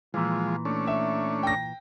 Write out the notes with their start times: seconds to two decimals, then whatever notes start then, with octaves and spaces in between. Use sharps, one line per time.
0.14 A#2 E3 F3 G#3
0.65 A3 C#4 D4
0.87 E5
1.43 G5 A#6